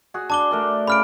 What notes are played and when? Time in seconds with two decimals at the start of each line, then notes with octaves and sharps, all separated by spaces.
0.14 F#4 G#4
0.30 D4 A5 D6 G7
0.51 A3 A#4 D5
0.87 C#3 B5 F6 D7